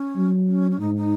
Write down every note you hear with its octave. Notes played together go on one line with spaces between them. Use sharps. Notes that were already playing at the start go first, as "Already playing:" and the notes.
Already playing: C#4
F#3
C#4
C#4
G#2 D#4
D#4